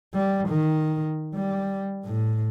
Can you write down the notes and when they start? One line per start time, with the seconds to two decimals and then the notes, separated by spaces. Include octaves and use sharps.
0.14 G3
0.48 D#3
1.35 G3
2.05 A2